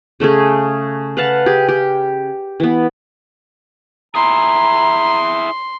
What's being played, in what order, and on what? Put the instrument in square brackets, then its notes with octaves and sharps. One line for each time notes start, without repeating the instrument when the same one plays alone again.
[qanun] C#3 A3 C#4 G#4
B4 F5 F#5 A5
G4 G#4
G4
E3 B3
[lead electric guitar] E4 G#4 [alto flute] A#5 [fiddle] C6